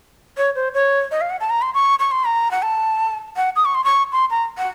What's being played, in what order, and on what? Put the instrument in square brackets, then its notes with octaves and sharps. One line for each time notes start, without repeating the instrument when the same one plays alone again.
[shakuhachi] C#5
C5
C#5
D#5
F5
F#5
A5
A#5
C6
C#6
C#6
C6
A#5
F#5
A5
F#5
D#6
C#6
C6
C#6
C6
A#5
F#5